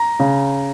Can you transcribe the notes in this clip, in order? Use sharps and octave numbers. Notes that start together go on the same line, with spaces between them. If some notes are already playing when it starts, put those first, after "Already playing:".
Already playing: A#5
C#3